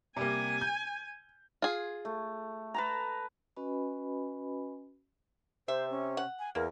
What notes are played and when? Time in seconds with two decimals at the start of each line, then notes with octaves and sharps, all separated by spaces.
0.17 C3 G3 A#3 G#5
0.61 G6
1.62 F4 G#4
2.05 A3
2.74 B4 A5 A#5
3.57 C#4 F#4 B4 D#5 G#5 B5
5.68 C3 C5 E5
5.91 C#4
6.17 F#5
6.39 G#5
6.55 E2 A#3 A#4